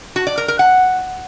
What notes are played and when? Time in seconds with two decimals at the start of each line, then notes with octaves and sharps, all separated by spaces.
0.16 F#4
0.27 D5
0.38 A#4
0.48 A#4
0.59 F#5